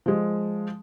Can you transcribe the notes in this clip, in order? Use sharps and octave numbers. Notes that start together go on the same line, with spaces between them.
F3 G#3